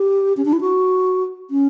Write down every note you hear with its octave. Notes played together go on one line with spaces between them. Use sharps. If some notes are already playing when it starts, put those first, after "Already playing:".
Already playing: G4
C#4
D4
E4
F#4
C#4